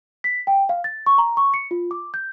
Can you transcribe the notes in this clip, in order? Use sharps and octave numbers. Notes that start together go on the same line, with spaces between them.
B6
G5
F5
A6
C#6
A#5
C#6
C#7
F4
D6
G6